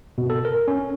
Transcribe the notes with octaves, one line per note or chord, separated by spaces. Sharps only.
B2
A4
A#4
C#4